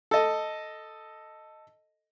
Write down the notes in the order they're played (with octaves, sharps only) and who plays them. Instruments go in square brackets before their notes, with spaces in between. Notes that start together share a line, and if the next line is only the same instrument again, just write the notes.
[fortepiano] A4 D#5